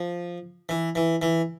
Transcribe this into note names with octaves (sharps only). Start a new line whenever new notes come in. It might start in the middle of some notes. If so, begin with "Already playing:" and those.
Already playing: F3
E3
E3
E3